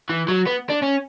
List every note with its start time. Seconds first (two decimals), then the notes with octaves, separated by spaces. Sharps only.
0.09 E3
0.28 F#3
0.47 B3
0.70 D4
0.83 C#4